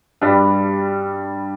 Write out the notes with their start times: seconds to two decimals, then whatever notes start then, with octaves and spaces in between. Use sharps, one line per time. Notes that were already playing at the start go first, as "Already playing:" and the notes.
0.21 G2 G3